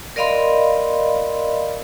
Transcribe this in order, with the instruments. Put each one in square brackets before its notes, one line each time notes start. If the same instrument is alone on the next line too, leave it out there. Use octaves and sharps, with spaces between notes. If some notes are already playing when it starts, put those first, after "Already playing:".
[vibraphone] A#4 D5 D#5 F5 B5 C6